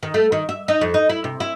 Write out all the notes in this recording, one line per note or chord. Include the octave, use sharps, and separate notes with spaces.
D#3
A3
D#3
E5
D#4
F2
D#4
E4
C3
E4